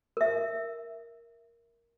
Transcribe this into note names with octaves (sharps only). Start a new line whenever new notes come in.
A#4 E5